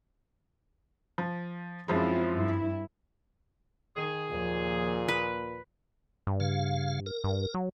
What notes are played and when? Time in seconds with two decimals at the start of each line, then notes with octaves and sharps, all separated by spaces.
1.18 F3
1.88 F#2 F3 G#3 C4 E4 F4
2.36 G2 E4
3.96 D#3 G#4
4.30 D#2 A#2 F3
5.08 B4
6.27 G2
6.40 C#3 F5
7.06 A#4
7.24 G2
7.54 F#3